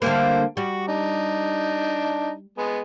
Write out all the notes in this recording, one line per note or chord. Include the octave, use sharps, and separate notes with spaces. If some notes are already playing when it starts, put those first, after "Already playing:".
D3 G3 A3 A#3 C5
G3 F#4
D4 D#4
G#3 B3